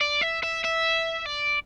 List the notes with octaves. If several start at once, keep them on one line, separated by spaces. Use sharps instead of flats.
D5
E5
E5
E5
D5